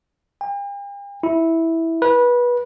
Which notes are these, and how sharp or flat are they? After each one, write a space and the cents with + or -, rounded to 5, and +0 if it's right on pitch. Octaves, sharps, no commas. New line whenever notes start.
G5 +45
E4 -10
B4 -25